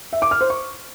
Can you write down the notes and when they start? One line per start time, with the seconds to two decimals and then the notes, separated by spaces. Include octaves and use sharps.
0.13 E5
0.22 D6
0.31 F6
0.41 C5
0.50 C#6